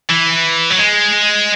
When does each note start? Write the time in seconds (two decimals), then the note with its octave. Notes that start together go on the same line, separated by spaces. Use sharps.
0.09 E3
0.70 F#3
0.78 G#3